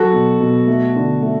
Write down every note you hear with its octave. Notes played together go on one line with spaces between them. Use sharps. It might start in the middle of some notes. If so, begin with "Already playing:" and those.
Already playing: F#3 F#4 A4
B2
B2
A3
D3
A3